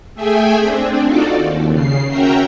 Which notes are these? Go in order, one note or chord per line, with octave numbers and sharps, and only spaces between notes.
A3 G#4 E5 G5 G#5
C4 D4
D#4 F4 F#4 A4 D5
D#2
C#3 C7
C#4 F#4 A#4 E5 G5 A#5